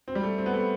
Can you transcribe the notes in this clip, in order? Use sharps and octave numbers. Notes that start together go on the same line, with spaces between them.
C4
G3
A3
C4
B3
A3